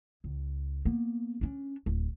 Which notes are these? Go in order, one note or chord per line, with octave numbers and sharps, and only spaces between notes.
C#2
A#3 B3
C#4 D4
D1